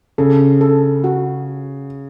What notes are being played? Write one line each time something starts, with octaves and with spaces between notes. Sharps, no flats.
C#3 A4
A4
F#4